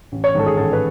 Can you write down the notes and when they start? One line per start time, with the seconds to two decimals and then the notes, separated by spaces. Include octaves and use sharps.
0.12 A1
0.24 C#5
0.35 G#2 D#3 G#3 A4
0.46 G#4
0.57 A1 A4
0.73 B4